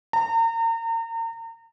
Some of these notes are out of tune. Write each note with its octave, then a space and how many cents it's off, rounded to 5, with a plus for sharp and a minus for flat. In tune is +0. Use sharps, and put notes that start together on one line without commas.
A#5 -40